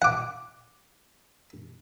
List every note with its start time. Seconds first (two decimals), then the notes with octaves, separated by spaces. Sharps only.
0.02 F#5 D6